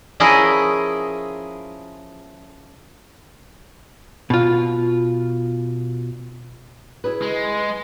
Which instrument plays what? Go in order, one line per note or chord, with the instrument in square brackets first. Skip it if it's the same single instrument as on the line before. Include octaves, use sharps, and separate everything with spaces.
[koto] F3 C#4 E4 G#4 A#4 D#5
[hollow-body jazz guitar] B2 F4
[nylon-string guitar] E4 G#4 B4
[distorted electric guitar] G#3